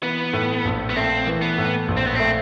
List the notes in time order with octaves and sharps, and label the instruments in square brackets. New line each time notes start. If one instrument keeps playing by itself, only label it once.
[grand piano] E3 [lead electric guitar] B3
[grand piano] A2
A#1
[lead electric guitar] B3
[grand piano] A3 [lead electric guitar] C4
[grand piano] E3
[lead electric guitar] B3
[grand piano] A2
A#1
[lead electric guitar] C4
B3
[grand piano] A3 [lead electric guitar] C4